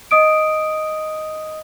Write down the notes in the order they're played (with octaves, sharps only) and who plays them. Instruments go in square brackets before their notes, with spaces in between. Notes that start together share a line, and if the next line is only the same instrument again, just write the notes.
[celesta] D#5 D#6 D7